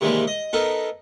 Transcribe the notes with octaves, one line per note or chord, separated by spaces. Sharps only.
C3 D#3 E3 G3 G#3 A#3
D#5
B3 D#4 A4 A#4